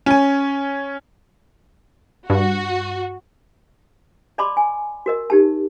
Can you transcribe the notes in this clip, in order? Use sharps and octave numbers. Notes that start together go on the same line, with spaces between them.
C#4 G#5
G2 F#4
D5 D#5 A5 B5 C6 D6
G#5
F#4 A#4 D#5
D#4 G4 A5